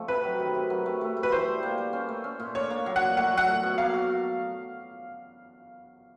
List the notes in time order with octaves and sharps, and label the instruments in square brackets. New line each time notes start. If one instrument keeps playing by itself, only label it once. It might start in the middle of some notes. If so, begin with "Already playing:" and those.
Already playing: [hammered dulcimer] F3 A3 C4
[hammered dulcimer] C3 [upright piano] B4
[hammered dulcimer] F#3
D#3
C3
F#3
A3
A3
A3
[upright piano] B4
[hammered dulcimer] E3 [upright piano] C5
[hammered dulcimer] G3
A#3
G3
C#4
A3
C#4
A#2
[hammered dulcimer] D4 [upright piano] C#5
[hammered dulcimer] A#3
F#3
[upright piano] F#5
[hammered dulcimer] F#4
[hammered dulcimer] A3 [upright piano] F#5
[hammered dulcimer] F#3
[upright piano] F#5
[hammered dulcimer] A3
B2
[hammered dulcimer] A#3 [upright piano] F5
[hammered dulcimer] F#4